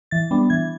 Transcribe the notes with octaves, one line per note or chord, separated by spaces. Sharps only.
E3 A6
G3 B3 D4
E3 G#6